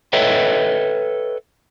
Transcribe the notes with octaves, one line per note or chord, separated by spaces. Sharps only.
A4 B4 C#5 D#5 E5 G5